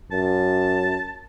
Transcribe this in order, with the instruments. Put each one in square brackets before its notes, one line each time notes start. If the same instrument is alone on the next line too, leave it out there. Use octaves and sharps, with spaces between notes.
[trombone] F#2 [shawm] A5